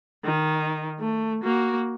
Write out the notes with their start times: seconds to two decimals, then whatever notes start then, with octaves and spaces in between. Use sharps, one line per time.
0.25 D#3
1.00 A3
1.44 A#3 F#4